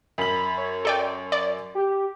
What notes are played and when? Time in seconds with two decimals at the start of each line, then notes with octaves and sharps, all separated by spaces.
0.18 F#2 B5 F#7
0.58 C#5
0.85 A4 D5 G5
1.32 D5
1.75 G4